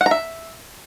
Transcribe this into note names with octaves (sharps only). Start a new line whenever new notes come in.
F#5
A#5
E5